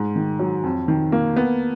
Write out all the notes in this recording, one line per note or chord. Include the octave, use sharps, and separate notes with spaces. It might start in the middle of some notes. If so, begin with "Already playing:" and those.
Already playing: G#2
D#3
F#3
F2
D#3
A#3
B3